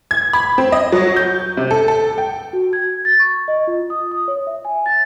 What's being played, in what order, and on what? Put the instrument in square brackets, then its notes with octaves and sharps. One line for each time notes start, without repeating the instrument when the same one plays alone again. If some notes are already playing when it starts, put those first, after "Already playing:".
[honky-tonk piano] G#6
B5
C4
D#5
F#3
G6
C3
A4
A4
G5
[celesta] F#4
G#6
A6
C#6
D#5
F4
D#6
D#6
C#5
E5
G#5
A6